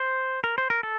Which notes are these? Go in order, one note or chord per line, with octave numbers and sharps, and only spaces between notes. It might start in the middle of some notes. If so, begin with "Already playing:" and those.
Already playing: C5
A#4
C5
A#4
A4